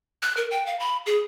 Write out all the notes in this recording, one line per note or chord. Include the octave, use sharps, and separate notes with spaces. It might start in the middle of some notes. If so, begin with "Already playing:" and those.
F#6
A#4
G5
F5
B5
G#4